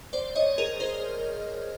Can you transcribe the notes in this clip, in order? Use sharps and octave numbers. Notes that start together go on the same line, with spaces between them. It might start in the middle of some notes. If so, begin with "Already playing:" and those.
C5 D5
C#5 D#5
G#4 A#4
A#4 C5